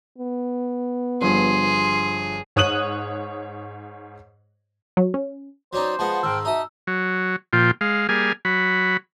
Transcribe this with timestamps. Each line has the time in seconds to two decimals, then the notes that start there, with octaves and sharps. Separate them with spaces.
0.18 B3
1.22 G1 G2 F3 G#4 C6
2.56 G#2 C#5 D#6 F#6 D#7 F#7
4.97 F#3
5.14 C#4
5.73 F#3 C#4 D#4 C5 D5 D6
5.99 F3 G#3 B3 F#5 A5
6.23 G#2 D#3 G5 E6 F6
6.45 D#4 F#4 E5 A5 D#6
6.87 F#3
7.53 A#2 F3 F4 G5
7.81 G#3 F5
8.09 G3 A#3 G#4 G#5 F6
8.45 F#3 B5